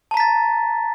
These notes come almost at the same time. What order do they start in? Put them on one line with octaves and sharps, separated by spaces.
A5 A#5 B6 A6